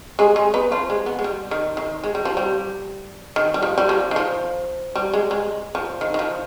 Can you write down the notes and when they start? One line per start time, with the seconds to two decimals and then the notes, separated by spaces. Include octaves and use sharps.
0.19 G#3 G#4
0.36 G#3 G#4
0.54 B3 B4
0.72 F3 F4
0.90 G#3
1.06 B3
1.19 G#3
1.24 G3
1.51 D#3
1.77 D#3
2.04 G#3
2.15 G3
2.25 F3
2.37 G3
3.36 D#3
3.54 G3
3.63 F3
3.78 G3
3.89 F3
4.11 D#3
4.16 F3
4.96 G3
5.13 G#3
5.31 G#3
5.75 F3
6.01 D#3
6.14 D#3
6.19 F3